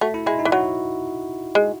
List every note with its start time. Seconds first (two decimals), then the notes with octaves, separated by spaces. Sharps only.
0.01 A3 F#4
0.14 E4
0.26 G#3 E4
0.39 D#4
0.45 E3
0.52 F#3 F#4
1.55 G#3